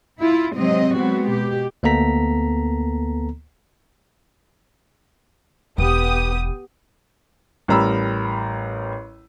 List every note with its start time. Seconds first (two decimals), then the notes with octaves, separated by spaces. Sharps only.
0.21 E4 F4
0.54 G#2 C3 F#3 C4 D#5
0.96 F#3 G#3 B3 C4 F#4
1.29 B2 G4
1.83 D2 A#3 B3 A4 A#5 B6
5.78 E1 B3 G4 D#6
7.68 A1 G3 A#4 A#5 B5 E6